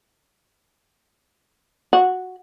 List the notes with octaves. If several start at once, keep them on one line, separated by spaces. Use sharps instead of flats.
F#4